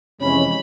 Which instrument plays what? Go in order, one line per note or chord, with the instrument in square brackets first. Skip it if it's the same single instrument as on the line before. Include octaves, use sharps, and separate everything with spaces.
[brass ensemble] F2 C3 E3 G#3 C#4 [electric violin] B5